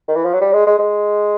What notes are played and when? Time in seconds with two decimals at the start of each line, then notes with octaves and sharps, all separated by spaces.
0.08 D#3
0.16 E3
0.25 F3
0.33 F#3
0.41 G3
0.53 G#3
0.67 G#3
0.79 G#3